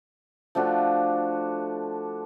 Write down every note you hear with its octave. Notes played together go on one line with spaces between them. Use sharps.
F3 A3 D4 F#4